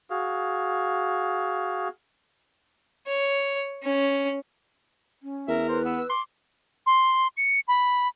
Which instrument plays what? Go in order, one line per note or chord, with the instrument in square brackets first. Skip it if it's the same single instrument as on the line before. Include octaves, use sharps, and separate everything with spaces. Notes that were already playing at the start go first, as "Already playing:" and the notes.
[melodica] F#4 G#4 F5
[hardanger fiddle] C#5
C#4
[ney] C#4
[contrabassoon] E2 [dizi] A#4 [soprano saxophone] E5
[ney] B4 [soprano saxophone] C5
[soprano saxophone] B3 [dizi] E6
[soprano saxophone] C6 [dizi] D6
[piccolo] C6
C#7
B5